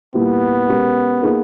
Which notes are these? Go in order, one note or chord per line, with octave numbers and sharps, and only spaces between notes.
A#2 G3 A#3 B3 E4 G4
B2 G#3 C#4 G4 A#4
A#3 D#4 G#4 B4